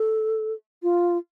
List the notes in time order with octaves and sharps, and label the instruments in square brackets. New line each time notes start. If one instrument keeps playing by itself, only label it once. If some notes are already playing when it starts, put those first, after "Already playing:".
Already playing: [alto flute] A4
F4